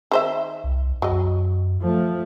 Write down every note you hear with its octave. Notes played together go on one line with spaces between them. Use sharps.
D#3 C5 E5
C2
F#2 F#3 D#5
F3 A3